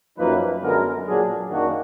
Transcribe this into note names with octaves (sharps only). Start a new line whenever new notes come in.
F#2 F3 A#3 D#4 B4
F#2 D3 G#3 B3 A#4
A#2 F#3 D4 G#4
F#2 D#3 A#3 D4 F#4